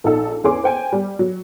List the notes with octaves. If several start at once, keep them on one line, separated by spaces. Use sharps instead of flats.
A#1 D#4 A4
E2 C#4 G#4 C6 D6
C5 G5 G#5
G3
F#3